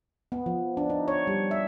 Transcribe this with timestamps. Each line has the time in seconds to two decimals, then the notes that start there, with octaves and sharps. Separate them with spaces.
0.32 B3
0.46 F3
0.77 D4
0.90 D#4
1.08 C#5
1.27 G3
1.51 E5